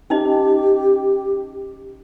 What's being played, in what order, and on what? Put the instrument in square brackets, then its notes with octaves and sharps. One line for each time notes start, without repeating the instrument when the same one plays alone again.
[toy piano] C#4 D#4 D#5 [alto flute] G4